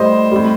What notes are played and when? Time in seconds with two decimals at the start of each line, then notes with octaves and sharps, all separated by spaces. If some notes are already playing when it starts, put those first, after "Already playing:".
Already playing: A2 G3 C5 D#5
0.32 A2 G3